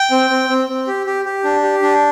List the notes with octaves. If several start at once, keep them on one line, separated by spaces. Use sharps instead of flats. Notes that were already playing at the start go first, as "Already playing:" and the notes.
Already playing: G5
C4
C4
C4
C4
G4
G4
G4
D4
G4
D4